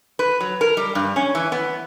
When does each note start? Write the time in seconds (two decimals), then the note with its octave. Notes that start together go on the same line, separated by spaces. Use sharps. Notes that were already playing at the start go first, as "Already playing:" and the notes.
0.19 B4
0.41 F#3
0.61 A#4
0.77 G3
0.95 G2
1.16 C#4
1.35 E3
1.52 B3